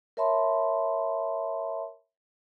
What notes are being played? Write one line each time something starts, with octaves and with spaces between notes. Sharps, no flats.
A#4 C#5 E5 A5 B5 C6